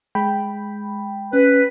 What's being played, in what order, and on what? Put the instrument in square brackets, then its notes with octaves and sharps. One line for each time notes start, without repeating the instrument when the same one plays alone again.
[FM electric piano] G#3 G5 B5
[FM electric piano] C#4 [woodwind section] B4